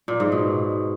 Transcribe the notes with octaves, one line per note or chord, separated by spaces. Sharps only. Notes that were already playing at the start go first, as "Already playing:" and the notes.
A#2
G#2
B2